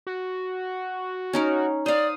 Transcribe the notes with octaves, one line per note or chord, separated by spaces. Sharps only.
F#4
C#4 D#4 A#4
C5 D5 F5 D#6